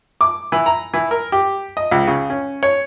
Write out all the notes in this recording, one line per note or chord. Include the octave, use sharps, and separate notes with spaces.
D6
E3
A#5
E3
A#4
G4
D#5
C#2
C#3
C#4
C#5